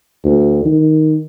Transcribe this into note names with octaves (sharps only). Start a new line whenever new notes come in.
D2
D#3